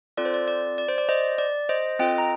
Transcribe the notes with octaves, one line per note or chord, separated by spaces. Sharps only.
C4 F4 A4 D5
C5
D5
D5
D5
C5
D5
C5 D#5
D5
C5 D#5
C4 F4 A4 D#5 G5
A#5